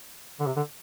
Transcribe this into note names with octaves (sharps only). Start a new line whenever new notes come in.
D3
C3
D3